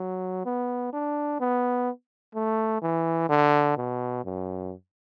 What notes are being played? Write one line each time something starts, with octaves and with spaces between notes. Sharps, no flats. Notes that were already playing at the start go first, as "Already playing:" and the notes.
Already playing: F#3
B3
D4
B3
A3
E3
D3
B2
F#2